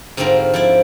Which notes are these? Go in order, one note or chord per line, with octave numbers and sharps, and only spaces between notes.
G#2 D3 G3 C4 F4 A#4
F3 E4 D5